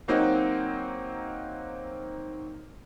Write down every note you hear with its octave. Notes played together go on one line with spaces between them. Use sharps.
F#3 A#3 C4 D#4 F#4